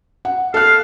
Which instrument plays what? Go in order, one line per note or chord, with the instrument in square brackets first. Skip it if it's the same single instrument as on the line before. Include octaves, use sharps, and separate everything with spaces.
[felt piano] F#5
[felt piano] A4 F#6 [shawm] F5